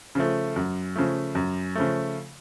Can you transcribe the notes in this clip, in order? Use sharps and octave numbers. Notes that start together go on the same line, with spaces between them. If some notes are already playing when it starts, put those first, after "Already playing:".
C#3 F3 A3
F#2
C#3 F3 A3
F#2
C#3 F3 A3